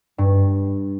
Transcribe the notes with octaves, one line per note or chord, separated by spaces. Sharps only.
G2